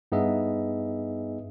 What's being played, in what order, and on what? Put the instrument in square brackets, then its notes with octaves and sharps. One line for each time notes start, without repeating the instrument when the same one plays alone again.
[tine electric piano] G2 B3 D#4 G#4 D#5 E5